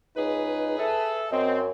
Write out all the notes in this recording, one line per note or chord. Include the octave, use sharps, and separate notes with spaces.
C#2 D#4 G#4 B4
A4 E5
F#2 C4 D#5